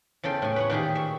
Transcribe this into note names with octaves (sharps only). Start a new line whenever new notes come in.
E2 C#3 A4 G5 C6
A2 G#5
B4 C#5 F#5
A#2 D#3 G4 G#4
C#5 E5